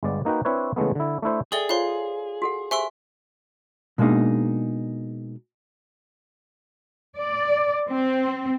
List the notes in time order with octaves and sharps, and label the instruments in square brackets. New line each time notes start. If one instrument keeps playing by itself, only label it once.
[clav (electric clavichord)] G1 G#3 B3 D5
A#3 D#4 F#4 B4 G5
C4 D4 E4 B4 C#5
C#3 E3 G#3 A3 B3
D3 E4
A3 D4 E4 C5
[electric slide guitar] G#4 [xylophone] A4 D5 G7 [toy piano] E5 G5 D#6
[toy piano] F4 C5 C#5 [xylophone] F5 C6
[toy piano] F#4 A4 F#5
[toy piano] G4 C5 G#5 [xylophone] E5 C6 E6
[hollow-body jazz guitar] B2 G#3 A#3 D4 D#4 G#4
[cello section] D5
C4